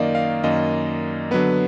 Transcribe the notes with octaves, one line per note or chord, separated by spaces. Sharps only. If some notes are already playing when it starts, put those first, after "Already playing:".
Already playing: F#2 D#3 A#3 D5 D#5 F5
F5
F#2 D#3 A#3 D#5
D3 F#3 B3 B4